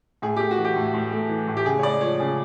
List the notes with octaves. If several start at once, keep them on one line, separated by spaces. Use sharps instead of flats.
A2 G#4
A3 G4
F#4
E3
G4
A2
A2
A3
E3
A2
G4
C#3 G#4
C#5
G#3 D5
F3 C#5
C#3 G#4